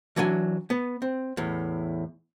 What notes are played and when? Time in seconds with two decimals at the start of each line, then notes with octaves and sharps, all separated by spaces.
0.16 E3 F#3 D4 F5 G#5
0.70 B3
1.02 C4
1.37 E2 A2